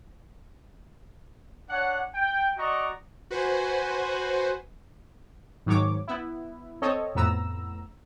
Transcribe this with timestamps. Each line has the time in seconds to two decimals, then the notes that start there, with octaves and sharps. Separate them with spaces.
1.69 D4 C#5 F#5
2.14 G5
2.58 F#4 D5 D#5 A#5 C#6
3.31 F#4 B4 C5 F#5 G#5
5.66 G#2 D#3 F#3 C#5 D6
6.08 B3 E4
6.82 C4 A4 C#5 D#5
7.15 F2 A2 B3 A#5 E6